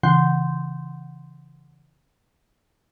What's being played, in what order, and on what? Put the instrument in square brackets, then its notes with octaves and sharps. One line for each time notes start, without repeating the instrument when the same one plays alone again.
[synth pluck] C#3 E3 F#5 C6 G6